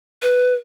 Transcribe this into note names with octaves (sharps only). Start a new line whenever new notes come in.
B4